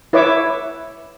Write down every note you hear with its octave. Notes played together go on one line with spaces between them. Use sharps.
E4 B4 C#5 E5 D6